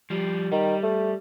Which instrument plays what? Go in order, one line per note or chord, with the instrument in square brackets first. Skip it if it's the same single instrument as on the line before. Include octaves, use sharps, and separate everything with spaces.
[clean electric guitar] F3 G3
[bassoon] D#3 [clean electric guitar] G3
[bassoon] A3